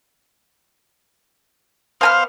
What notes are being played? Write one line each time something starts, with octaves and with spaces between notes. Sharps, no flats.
B3 C5 F5 G#5 F6